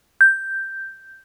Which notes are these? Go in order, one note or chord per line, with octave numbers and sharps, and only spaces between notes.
G6